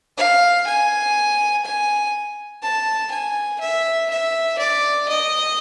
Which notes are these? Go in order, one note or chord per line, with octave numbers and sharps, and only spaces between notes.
F5
G#5
G#5
A5
G#5
E5
E5
D5
D#5